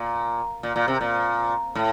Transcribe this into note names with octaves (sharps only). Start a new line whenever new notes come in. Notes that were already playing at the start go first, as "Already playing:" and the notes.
Already playing: A#2
A#2
A#2
C3
A#2
A2